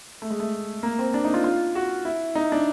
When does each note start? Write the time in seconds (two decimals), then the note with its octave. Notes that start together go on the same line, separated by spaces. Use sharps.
0.22 A3
0.30 G#3
0.40 A3
0.83 A#3
0.99 C4
1.14 D4
1.25 D#4
1.34 F4
1.44 F4
1.75 F#4
2.05 E4
2.35 D#4
2.52 D4